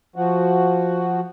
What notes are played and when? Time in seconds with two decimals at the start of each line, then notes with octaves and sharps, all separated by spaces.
0.16 F3 F#4